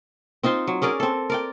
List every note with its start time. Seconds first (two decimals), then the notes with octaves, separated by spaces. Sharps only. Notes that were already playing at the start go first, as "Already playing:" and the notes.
0.43 C4 D#4 F4 C5
0.68 F#3
0.82 C#4 G#4 A#4 D5
1.00 C4 A4
1.30 A#4 D5 G5